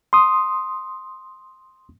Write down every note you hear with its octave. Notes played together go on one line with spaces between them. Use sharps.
C6 D#6